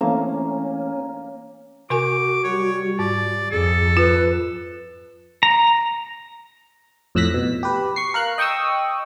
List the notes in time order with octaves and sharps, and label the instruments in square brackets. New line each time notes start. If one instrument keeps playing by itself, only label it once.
[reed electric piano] E3 A3 C4 [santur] A#3 [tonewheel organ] C#4
[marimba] C3 A#4 G#5 [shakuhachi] F#4 [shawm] D6
[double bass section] G3 [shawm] C#5
[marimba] G#2 [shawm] D5
[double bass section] F2 [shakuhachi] G#4 [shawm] A4
[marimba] F4 [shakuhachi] B4
[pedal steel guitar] A#5
[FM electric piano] F2 A2 E6 F#6 A#6 B6
B2
G4 B4
C#6 C7
A#4 F5 F#6
D#5 G5 C#6 D#6 E6